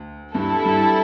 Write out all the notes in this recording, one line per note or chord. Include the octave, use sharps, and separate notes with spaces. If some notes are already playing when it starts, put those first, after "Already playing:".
Already playing: D2
G2 G3 E4 A4
G2